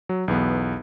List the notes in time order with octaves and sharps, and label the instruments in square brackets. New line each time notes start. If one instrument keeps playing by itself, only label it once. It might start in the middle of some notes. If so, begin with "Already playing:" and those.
[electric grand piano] F#3
B1 E2 B3